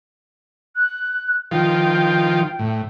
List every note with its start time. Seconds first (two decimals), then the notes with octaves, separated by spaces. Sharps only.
0.76 F#6
1.51 D#3 F3 F4 G5
2.59 A2